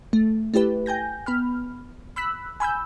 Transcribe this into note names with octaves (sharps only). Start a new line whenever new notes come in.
A3
A3 E4 G4 B4
G5 G#5 G6 A#6
B3 B5 F6
B5 E6 F#6 B6
G#5 B5 E6 G6